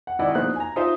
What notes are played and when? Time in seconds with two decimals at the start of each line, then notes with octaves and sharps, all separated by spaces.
0.07 F#5
0.19 G#1 E4 D5 D#5 F#5
0.35 A#1 B2 D#4 C5 F#6
0.56 G#5 A#5
0.76 D#4 F4 C5 D#5 E5